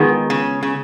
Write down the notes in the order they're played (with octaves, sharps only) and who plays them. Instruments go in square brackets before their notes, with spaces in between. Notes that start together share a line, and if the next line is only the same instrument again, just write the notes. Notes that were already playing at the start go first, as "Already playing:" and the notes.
Already playing: [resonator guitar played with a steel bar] D#3 [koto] G#3 B3 F4 G#4
[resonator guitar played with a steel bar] C#3
C#3